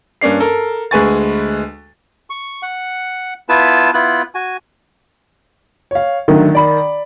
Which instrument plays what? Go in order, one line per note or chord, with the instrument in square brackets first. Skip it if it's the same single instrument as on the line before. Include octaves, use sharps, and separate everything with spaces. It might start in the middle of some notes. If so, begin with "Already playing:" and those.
[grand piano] G2 A#3 C#4 D4 C7
A4 A#4
D2 G#3 B4 G#5 C#6 A6
[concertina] C#6
F#5
B3 E4 F4 B4 A5
B3 E4 F4 F#6
F#4 G#5
[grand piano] C#5 F5
[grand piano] D3 F#3 A3 [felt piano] D#3
[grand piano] D5 B5